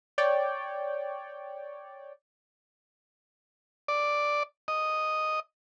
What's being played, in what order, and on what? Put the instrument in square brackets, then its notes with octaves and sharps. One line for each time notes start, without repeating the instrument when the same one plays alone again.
[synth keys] C#5 D5 G5
[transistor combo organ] D5
D#5